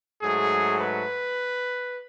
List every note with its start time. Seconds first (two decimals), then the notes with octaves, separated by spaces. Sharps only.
0.22 G#2 F#3 A3 G#4
0.80 B4